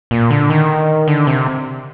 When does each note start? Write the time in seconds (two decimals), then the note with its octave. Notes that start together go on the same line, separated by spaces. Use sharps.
0.11 A#2
0.31 D3
0.50 D#3
1.08 D3
1.27 C3